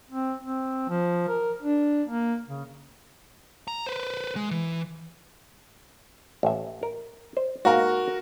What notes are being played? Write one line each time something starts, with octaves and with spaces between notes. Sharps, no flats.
C4
C4
F3
A#4
D4
A#3
C#3
A#5
B4 C5
G#3
E3
A1 E5
A#4
C5
G#2 B2 A#3 F#4 A#4